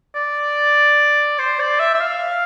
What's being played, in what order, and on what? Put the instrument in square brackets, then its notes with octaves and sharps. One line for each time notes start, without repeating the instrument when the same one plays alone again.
[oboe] D5
C5
D5
E5
E5
F5